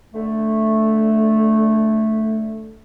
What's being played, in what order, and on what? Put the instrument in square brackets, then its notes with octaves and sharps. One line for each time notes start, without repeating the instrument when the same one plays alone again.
[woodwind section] D3 A3